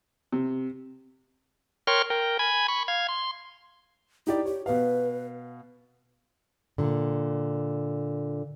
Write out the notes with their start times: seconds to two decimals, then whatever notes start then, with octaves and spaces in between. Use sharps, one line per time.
0.32 C3
1.87 A#4 C#5 G5 C6 C#6 F6
2.10 A#4 G5
2.39 G#5 B5 G#6
2.68 B5 C#6
2.88 F5 G#6
3.09 C6
4.27 D#4 E4 G4 D5
4.45 G4 C#5
4.66 B2 B4 F5
6.78 A#2 D3